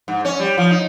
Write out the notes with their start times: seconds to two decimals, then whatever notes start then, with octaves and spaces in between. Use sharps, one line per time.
0.08 G#2
0.25 C#4
0.40 G3
0.58 F3
0.71 D#4